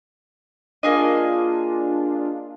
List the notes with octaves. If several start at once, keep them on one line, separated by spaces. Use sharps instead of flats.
A#3 D4 F4 G#4 D#5